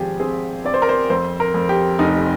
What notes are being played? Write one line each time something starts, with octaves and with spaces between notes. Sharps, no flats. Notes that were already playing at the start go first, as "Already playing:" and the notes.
Already playing: G#1 F3 G4 G#4
C4 G#4
C4 D5
C5
A#4
C5
F2 C5
A#4
F2
G4
F1 D#4